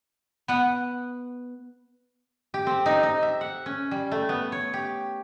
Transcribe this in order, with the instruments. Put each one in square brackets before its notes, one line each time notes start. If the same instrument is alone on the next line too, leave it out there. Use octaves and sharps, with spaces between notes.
[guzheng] B3 F#5
[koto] G4
C4
D#4
D#4
E5
F#5
C#4
G3
A3
B3
C#5
G4